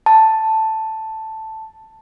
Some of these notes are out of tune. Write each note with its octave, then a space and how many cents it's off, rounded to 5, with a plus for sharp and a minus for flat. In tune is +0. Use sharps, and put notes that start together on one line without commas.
A5 +5